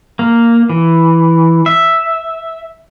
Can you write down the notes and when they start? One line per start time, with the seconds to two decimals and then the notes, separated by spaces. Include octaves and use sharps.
0.19 A#3
0.69 E3
1.66 E5